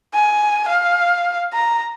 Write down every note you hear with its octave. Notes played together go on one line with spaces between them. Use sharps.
G#5
F5
A#5